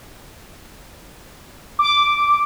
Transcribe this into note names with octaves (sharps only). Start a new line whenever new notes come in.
D6